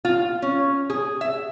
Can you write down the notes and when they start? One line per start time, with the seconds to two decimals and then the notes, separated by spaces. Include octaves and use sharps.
0.05 F4
0.42 C#4
0.90 G#4
1.21 E5